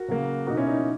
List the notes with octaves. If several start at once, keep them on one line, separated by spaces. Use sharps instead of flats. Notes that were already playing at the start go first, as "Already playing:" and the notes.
Already playing: F#4 A#4
C#3 F#3 A#3
B2 A#3 D#4 F#4
C#4 E4
D#4
D#4